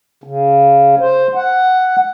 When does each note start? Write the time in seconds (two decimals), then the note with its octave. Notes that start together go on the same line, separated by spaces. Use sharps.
0.24 C#3
1.00 C5
1.35 F#5